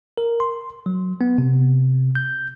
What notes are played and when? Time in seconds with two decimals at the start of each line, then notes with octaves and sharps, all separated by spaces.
0.18 A#4
0.40 C6
0.86 F#3
1.21 B3
1.38 C3
2.15 G6